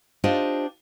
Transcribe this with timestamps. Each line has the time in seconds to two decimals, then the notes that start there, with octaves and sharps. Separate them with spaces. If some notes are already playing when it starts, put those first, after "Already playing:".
0.24 D4 D#4 F4 G4 C5 D#5